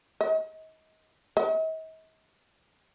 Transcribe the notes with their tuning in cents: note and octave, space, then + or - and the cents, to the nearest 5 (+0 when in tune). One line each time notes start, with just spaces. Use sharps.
D#5 +30
D#5 +45